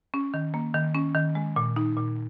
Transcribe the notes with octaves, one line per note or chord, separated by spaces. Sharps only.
C#4
D#3
A#3
D#3
C#4
D#3
G#3
A#2
D#4
A#2